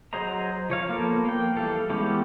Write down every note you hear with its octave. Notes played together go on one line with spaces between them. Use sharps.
F#3 G#4 C5 D#5 A#5
F3 C#5 F5
F3 A#3 B3 A4 A#4
A#3 G5
E3 G3 A4 F5
E3 G#3 B3 C#4 G4